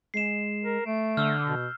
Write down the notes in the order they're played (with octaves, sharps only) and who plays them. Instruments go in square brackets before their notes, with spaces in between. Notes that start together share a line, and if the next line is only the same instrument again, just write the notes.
[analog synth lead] G#3 [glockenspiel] C7 E7
[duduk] A#4
[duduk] A3 [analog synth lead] D7
[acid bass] D3 [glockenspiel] E6 F6 [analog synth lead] G6
[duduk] B2